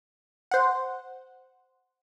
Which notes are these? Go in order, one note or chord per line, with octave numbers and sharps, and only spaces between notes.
C5 F#5